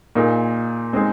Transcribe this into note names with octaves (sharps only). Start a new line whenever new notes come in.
A#2 A#3 D#4 G#4
G#3 C4 D#4 G#4